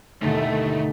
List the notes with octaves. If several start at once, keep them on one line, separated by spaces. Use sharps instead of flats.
G1 D#2 B2 A3 D#4 E4